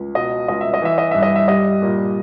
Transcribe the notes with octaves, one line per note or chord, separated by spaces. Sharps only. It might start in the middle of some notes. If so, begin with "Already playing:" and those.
Already playing: C#2
B2 D#5
C#2 D#5
E5
D#5
E3 E5
D#5
G2 E5
D#5
E5
G3 D#5
A#2